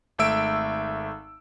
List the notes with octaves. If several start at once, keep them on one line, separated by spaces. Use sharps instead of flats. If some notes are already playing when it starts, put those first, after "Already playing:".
G#1 A3 E5 E6 D7